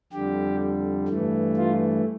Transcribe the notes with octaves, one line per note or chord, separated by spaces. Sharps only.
F2 D3 G3 G4
G2 E3 A3
F4